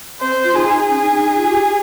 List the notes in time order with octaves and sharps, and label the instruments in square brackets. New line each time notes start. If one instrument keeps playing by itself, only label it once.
[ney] C4 [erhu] C5
[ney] F4
[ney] D#4 [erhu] G#4
[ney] C#4 [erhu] G#4
[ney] D#4
D#4
D#4
F4
G4